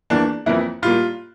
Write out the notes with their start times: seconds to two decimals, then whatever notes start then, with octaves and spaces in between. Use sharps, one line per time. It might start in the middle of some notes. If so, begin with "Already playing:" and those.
0.10 E2 E3 A#3 D4
0.46 F2 E3 A#3 E4
0.82 A2 G3 A#3 F4